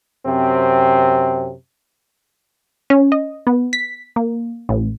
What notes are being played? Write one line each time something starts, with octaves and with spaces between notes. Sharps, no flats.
F#2 C3 C4
C#4
D#5
B3
B6
A#3
A1